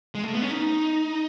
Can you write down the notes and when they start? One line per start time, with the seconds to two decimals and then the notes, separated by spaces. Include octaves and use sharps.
0.15 G#3
0.24 A3
0.33 B3
0.42 C#4
0.50 D#4